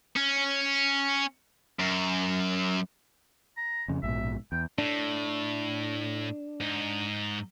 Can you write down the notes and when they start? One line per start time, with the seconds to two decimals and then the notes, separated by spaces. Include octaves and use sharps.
0.16 C#4
1.80 F#2
3.57 A#5
3.88 F2 C#3
4.03 A#1 G#2 B2 E5
4.52 E2 G5
4.78 A2 D4
6.61 G#2 D#4